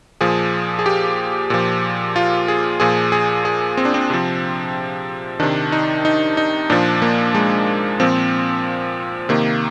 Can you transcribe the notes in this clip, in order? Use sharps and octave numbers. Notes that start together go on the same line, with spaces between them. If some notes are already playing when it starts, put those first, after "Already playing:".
A#2 F3 G#4
G#4
G4
A#2 F3
F4
G#4
A#2 F3 G#4
G#4
G#4
C4
D4
C4
C3 F3
C3 D#3 D4
D#4
D#4
D#4
A#2 F3 D4
A#3
G#3
A#2 F3 C4
C3 D#3 A#3